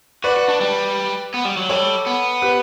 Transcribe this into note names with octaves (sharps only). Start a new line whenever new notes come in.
F#4 B4 D5
F#4
D4
G3
B3
G3
F#3
G3 A4 C#5
B3
G4 B4